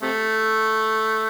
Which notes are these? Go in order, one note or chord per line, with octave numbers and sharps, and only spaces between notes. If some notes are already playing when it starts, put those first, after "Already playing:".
C3 A3